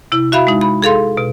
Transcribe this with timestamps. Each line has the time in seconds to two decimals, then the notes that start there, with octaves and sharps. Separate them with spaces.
0.12 C3 E4
0.32 F#4 E5 F5 B5
0.47 G#3 D#4
0.61 B5
0.82 G#4 A4 F5 C6
1.17 B2